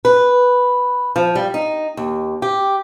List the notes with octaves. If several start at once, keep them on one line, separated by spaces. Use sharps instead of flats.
B4
F3
G3
D#4
D#2
G4